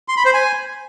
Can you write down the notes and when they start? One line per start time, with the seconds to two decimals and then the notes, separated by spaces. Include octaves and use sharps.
0.08 C6
0.17 B5
0.25 C5
0.34 G#5